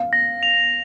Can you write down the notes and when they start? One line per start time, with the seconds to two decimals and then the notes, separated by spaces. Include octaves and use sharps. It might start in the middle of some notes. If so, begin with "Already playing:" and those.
Already playing: F5
0.13 A#6
0.43 F7